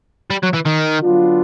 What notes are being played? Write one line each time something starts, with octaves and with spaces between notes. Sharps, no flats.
G3
F#3
E3
D#3
D3 F#3 B3 D4 F4